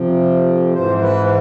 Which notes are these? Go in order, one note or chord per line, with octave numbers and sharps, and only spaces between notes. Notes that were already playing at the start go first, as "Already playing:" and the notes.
Already playing: F2 C3 F3
G#2 E3 C5
B4